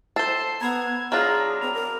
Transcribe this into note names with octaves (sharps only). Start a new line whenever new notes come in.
A4 C5 E6 C7 E7 G7
B3 A#5 B5 E6 G#6
F#3 D4 F4 G#4 A#5 F6
C4 B5
A#4